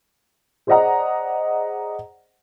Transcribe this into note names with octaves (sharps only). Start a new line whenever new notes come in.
G#4 C5 D5 D#5 F#5 A#5